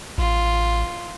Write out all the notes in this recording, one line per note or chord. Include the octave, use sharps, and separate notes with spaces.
A1 F4